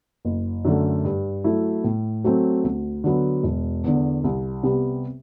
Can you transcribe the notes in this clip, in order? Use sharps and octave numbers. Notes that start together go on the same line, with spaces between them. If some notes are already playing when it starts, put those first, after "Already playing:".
F#1
F#2 D3 A3
G2
F#3 A3 E4
A2
F#3 A3 C4
D2
D3 F#3 B3
E1
E2 D3
C2
C3 G3 B3